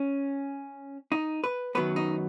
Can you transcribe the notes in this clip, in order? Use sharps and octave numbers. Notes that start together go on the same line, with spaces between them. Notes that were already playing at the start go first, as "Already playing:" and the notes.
Already playing: C#4
D#4
B4
F#2 D#3 F#3 B3 B4
D#4